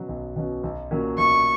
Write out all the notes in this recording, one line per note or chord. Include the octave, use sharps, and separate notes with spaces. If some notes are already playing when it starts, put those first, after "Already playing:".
Already playing: B2 F#3 C#4 F#4
B1
B2 F#3 C#4 F#4
B1
A#2 F#3 A#3 C#4
B1 C#6